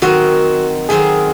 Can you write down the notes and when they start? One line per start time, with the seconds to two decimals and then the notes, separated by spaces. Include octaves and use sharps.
0.02 D#3 F#3 C4 D#4 F#4 A#4
0.89 D#3 F#3 C4 D#4 G#4 A#4